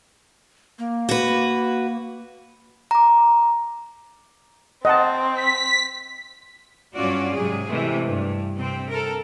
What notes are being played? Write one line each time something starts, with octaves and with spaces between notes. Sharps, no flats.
A#3
F#4 B4
A#5 D6
C4 D#5 F#5 A5
B6
G2 F#3 C#4 F4 F#4 D5
G#2 C3 F#3 G#4
C3 E3 G#3 A3
G2
C3 C4
A4 A#4